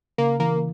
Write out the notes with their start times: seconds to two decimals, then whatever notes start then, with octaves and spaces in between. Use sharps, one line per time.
0.18 C#3 A#3
0.40 E3 A#3